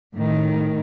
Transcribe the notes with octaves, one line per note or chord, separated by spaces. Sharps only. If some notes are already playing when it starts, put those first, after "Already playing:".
A2 D#3